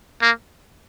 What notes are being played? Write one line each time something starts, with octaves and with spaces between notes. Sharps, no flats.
A#3